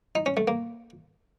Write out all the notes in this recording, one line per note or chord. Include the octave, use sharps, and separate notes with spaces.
D#4
C#4
A3
A#3